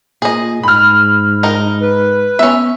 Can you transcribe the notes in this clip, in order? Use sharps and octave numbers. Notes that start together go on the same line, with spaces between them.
A#2 G#4 D#5
G#2 B5 F6
D#4 A#4
B4
B3 C#4 E5